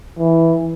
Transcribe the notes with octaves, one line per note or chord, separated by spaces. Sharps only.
E3